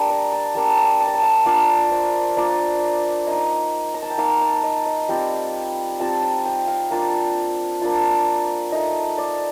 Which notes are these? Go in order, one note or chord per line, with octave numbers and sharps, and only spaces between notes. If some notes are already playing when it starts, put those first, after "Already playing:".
Already playing: G3 A#3 D4
A#5
A5
G3 A#3 D4 A5
A#5
A5
A#5
A5
F5
A#3 D4 F4 D5
C5
A#3 D4 F4 D5
A#3 D#4 D#5
A#5
A5
G5
A#3 D#4 F5
A5
D#5
D#5
G3 C4 F4 G5
G3 C4 F4 A5
A#5
G5
F5
A#3 D4 F4
A#3 D4 F4
A3 D#4 D#5
D5